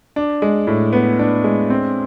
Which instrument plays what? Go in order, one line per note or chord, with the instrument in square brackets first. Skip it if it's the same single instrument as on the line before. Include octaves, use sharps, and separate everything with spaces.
[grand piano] D4
G#3
A2
B3
D4
G#3
C4